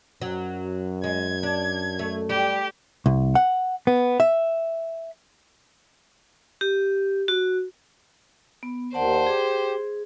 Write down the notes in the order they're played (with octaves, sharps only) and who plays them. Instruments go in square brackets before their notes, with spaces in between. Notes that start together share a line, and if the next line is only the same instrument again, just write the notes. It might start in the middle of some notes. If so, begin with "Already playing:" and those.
[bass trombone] F#2 [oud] F#3
[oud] G#3 [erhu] G#6
[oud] D4
A3
[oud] G3 [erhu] G4
[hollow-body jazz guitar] C2
F#5
B3
E5
[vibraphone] G4
F#4
B3
[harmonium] D#2 D#3 [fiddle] C5 [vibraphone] D5 F#5 A5
[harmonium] G4 [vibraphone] G#4